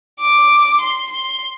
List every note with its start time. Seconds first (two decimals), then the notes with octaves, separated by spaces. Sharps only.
0.21 D6
0.81 C6
1.10 C6